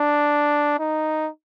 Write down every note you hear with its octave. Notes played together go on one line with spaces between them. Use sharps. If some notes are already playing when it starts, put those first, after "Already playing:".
Already playing: D4
D#4